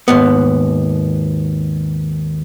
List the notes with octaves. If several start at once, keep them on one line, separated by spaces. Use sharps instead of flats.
D#2 G#2 B3